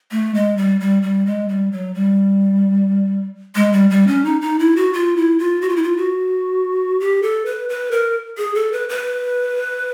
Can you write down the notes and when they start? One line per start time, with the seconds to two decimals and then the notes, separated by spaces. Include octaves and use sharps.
0.11 A3
0.34 G#3
0.57 G3
0.80 G3
1.02 G3
1.26 G#3
1.48 G3
1.72 F#3
1.94 G3
3.55 G#3
3.73 G3
3.90 G3
4.07 C#4
4.24 D#4
4.41 D#4
4.59 E4
4.76 F#4
4.93 F4
5.16 E4
5.39 F4
5.61 F#4
5.69 F4
5.76 E4
5.83 F4
5.97 F#4
7.00 G4
7.22 A4
7.45 B4
7.69 B4
7.91 A#4
8.38 G#4
8.55 A4
8.72 B4
8.89 B4